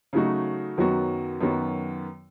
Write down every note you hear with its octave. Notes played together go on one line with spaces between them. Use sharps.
C#3 F#3 A3 D#4 F#4
F#2 D#3 F#3 B3 F#4
F#2 D#3 F#3 B3 F#4